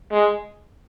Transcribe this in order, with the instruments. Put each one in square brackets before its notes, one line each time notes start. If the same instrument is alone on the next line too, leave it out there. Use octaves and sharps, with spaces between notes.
[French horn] G#3